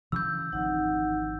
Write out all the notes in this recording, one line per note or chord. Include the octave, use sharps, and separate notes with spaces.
C#3 E3 F#3 E6 G6
G#1 F2 E3 D#4 F#5